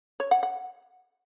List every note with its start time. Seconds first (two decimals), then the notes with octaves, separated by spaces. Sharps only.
0.20 C#5
0.31 F#5
0.43 F#5